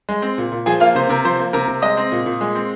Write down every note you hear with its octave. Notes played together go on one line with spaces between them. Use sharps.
G#3
C4
A#2
A#2
F3 G#4 G#5
A#3 F4 F5
C3 C5
C3 A#4
F3 C5
A#3
C3 A#4 A#5
C3
G#3 D#5 D#6
C4
A#2
A#2
G#3
C4